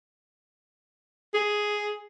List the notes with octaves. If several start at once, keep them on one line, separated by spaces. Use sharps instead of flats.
G#4